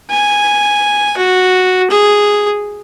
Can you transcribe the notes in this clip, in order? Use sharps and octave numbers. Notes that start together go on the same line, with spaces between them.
G#5
F#4
G#4